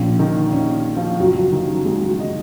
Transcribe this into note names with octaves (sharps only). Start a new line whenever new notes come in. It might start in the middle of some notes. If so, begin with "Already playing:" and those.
Already playing: A#1 A#2 F3 C#4
D#3 D#4
C#4
F3 F4
F#1 F#2 F3 F#3 F#4
F#3 F#4
D#3 D#4
F#3 F#4
G#3 G#4
F#3 F#4
D#4 D#5